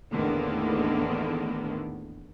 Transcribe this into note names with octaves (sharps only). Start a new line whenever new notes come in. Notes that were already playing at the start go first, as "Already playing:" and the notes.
E2 A2 D3 D#3 A#3 B3